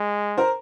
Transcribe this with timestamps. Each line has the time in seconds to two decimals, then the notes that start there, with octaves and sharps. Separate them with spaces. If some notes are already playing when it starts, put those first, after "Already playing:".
Already playing: G#3
0.38 A#4 C5